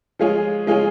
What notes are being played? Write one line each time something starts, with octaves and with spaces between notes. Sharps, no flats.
F3 G#3 F4 G#4 C#5
F3 G#3 F4 G#4 C#5